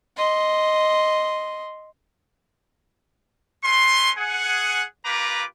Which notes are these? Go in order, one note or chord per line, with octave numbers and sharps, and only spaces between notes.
D#5 C6
A3 C#4 B4 C6
G#4 F#5 G#5
A#3 F4 G4 B4 A#5 D6